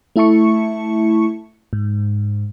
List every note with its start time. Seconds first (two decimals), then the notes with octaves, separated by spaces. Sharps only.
0.16 A3 E4 E5 A5 C#6 C#7
1.73 G#2